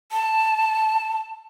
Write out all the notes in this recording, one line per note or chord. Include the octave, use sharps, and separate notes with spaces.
A5